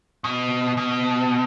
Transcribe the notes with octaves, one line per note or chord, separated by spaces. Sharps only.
B2
B2